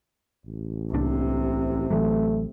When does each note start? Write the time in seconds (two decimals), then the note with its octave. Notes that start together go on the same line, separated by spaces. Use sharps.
0.45 A1
0.93 C2 C3 A#3 D4
1.91 A1 E3 F#3 A3